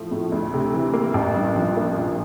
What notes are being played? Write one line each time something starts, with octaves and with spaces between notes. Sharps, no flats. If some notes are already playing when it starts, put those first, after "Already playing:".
Already playing: A2 F3 A3
A2
D2
C3
E3
A#3
A1
G2
F3
A#3
A#1